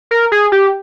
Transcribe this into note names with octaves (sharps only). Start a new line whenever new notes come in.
A#4
G#4
G4